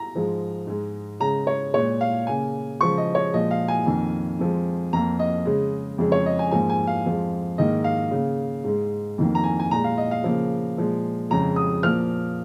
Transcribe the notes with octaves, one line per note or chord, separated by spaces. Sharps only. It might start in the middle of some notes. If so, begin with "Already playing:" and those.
Already playing: A#5
G#2 F3 G#3
G#2 G#3
C#3 G#3 A#5
C#5
A#2 G#3 C#5
F5
C#3 A#3 G#5
C#3 F3 G#3 C#6
D#5
C#5
A#2 F3 G#3 D#5
F5
G#5
F2 D#3 A#3
F2 F3 G#3
F2 F3 A#3 A#5
D#5
C#3 G#3
F2 C#3 G#3
C#5
D#5
G#5
G#2 F3 A#3 G#5
G#5
F5
F2 F3 G#3
G#2 D#3 A#3 D#5
F5
C#3 A#3
G#2 G#3
F2 D#3 A#3
A#5
G#5
G#5
A#2 G#3 A#5
F5
D#5
F5
C#3 F3 A#3
A#2 F3 G#3
F2 C#3 G#3 A#5
D#6
A#2 F3 A#3 F6